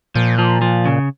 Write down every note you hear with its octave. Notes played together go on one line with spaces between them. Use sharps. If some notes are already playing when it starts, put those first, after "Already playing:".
A#2 F3
F3
F3
C#3